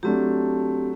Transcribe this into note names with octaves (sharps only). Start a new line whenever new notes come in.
F#3 A3 C4 D4 G4